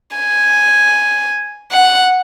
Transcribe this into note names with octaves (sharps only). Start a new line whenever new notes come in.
G#5
F#5